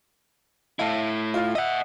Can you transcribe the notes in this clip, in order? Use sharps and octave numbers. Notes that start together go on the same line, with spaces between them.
A3 E4 E5 F5 A5
F4 F5
D#5 E5 F#5